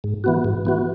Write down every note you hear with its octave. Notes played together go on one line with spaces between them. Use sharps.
G#2
E3 B3 F#4
G#2
E3 B3 F#4